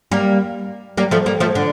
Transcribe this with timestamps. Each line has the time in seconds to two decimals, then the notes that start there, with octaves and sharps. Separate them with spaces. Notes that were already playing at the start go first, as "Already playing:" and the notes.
0.11 G3 A#3
0.97 G3 A#3
1.11 F3 A3
1.26 G3 A#3
1.40 F3 A3
1.55 D3